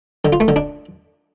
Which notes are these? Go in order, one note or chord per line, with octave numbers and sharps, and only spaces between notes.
D3
F4
A3
D3
D4